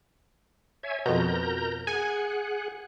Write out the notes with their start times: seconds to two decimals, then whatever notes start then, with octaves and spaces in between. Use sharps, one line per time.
0.83 C#5 E5 G#5
1.06 F2 B2 A#4 A#5 G6
1.87 G#4 F#5 G#5